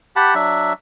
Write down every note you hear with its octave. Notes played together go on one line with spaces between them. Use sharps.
G4 F#5 A5 B5
F#3 D4 E5